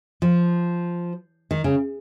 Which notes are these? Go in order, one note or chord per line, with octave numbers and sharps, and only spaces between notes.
F3
D#3
C#3